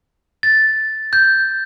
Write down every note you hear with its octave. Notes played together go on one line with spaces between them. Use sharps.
A6
G6